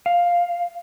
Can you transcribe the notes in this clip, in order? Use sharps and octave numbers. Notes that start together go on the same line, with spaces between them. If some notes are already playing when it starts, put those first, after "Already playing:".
F5